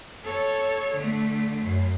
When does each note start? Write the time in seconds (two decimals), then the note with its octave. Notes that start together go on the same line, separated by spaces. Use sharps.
0.24 A4 C#5
0.94 D3 A3
1.61 F#2